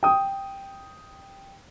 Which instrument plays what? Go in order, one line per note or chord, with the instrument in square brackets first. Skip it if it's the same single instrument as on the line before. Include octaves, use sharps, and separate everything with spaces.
[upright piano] G5 D#6